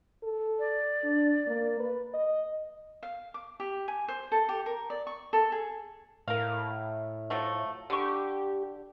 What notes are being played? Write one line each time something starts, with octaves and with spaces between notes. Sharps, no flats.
A4
D5
D4
A#3
B4
D#5
F5
D6
G4
G#5
C5
A4
G4
A#4
D5
C#6
A4
G#4
A2 A#4 F5
F3 F#3 A3
D3 G4 C#6